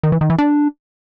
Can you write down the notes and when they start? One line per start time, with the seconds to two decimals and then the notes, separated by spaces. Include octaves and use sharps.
0.03 D#3
0.12 E3
0.21 D#3
0.30 E3
0.38 D4